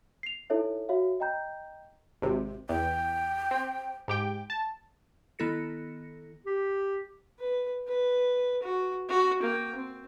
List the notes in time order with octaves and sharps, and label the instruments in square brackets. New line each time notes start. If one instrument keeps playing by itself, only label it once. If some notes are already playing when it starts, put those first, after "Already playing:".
[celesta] C7 F7
D#4 E4 A4 C#5 E5
F#4 C#5 E5 F5
D#5 G5 A#5 G6
[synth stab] G#1 C3
[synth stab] E2 [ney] G5
[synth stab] C4
G#2 G4 G5
A5
[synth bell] D#3 B3 E4 A4 A#6 C#7
[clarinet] G4
[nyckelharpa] B4
B4
F#4
F#4
A#3 G5
C4